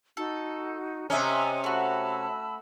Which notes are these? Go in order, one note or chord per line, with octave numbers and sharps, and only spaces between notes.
D#4 F#4 A4
C3 C#4 A#4 D#5 E5 G#5 D#6
A3 F#4 A5 B5 E6